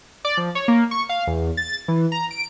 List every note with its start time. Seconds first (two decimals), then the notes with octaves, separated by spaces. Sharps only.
0.25 D5
0.37 F3
0.55 C#5
0.68 A#3
0.91 C#6
1.09 F5
1.27 E2
1.57 A6
1.88 E3
2.12 A#5
2.31 D7